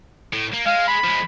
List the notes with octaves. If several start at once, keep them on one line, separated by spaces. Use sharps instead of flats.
A2
A#3
G#3 F5
B5
F3 G#3